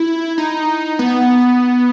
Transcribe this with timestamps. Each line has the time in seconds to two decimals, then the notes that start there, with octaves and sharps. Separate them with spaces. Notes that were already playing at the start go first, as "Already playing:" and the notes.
Already playing: E4
0.38 D#4
0.99 B3